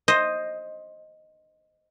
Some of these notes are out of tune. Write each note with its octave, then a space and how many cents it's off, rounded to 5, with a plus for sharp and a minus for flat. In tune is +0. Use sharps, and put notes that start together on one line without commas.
C5 +10 D#5 +0